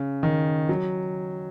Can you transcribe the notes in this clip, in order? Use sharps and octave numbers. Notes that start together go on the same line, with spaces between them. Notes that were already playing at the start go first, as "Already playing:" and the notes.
Already playing: C#3
D#3
F#3